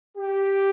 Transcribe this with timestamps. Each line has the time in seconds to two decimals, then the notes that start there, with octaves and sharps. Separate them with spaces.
0.17 G4